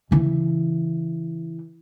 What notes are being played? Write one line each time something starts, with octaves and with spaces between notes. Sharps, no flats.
C#3 E3